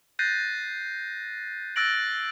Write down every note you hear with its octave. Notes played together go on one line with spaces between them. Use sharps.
F#6 G6 A6 A#6 C7 D#7
E6 F#6 A6 A#6 D7 F#7